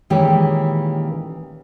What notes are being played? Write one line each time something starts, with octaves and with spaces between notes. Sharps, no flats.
A#2 D#3 E3 G#3 C#4 G4